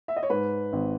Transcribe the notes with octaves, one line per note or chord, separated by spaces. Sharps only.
E5
D#5
C#5
G#2 B4
G#1